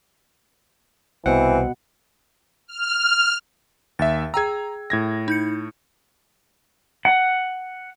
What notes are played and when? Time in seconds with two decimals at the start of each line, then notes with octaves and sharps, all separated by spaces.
1.26 C2 B2 E3 C4 F#5
2.67 F6
3.99 D#2 E5 A6
4.34 G#4 G5 A#5 E6 G#6
4.90 A2 G#6 A#6
5.28 D#4 G6 C#7
7.05 F#5